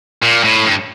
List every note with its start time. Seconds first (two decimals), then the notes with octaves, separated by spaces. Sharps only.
0.23 A#2
0.44 A2
0.66 G2